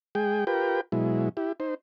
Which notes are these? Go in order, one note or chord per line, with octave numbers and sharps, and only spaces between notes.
G#3 G#4 G5
F4 G4 A#4 B4 G5
B2 F#3 G#3 E4
E4 G4
D#4 C5